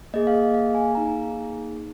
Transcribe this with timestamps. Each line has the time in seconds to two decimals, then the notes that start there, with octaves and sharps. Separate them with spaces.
0.14 A#3 G#4 D#5
0.27 F5
0.34 D#5
0.54 F5
0.75 G#5
0.95 A#3 D#4 G#4 A#5